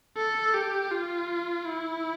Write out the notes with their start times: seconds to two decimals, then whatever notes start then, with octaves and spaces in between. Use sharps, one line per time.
0.17 A4
0.54 G4
0.91 F4
1.65 E4